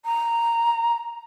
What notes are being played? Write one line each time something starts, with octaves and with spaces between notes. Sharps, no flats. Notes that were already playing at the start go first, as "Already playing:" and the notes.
A#5